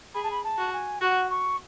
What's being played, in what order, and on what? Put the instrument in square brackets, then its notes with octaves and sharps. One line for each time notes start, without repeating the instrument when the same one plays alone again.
[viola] G#4 [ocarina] B5
[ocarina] A5
B5
A5
[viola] F#4
[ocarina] G#5
[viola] F#4 [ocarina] F#5
[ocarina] C#6